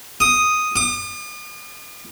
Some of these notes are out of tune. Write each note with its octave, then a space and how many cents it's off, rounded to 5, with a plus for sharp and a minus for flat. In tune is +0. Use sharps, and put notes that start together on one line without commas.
D#6 +0
D#6 -45